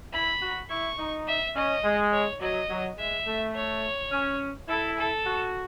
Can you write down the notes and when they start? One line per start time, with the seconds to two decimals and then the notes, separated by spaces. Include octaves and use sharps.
0.13 E4 B5
0.42 F#4
0.70 E4 C#6
0.99 D#4
1.28 E5
1.56 C#4 D#5
1.85 G#3
2.13 C#5
2.41 F#3 D#5
2.70 F#3
2.98 G#3 E5
3.27 A3
3.55 C#5
4.12 C#4
4.69 E4 A4
4.98 A4
5.26 F#4